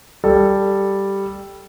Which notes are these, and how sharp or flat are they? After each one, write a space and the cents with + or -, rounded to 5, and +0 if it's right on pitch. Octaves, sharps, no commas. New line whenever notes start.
G3 +0 A4 +0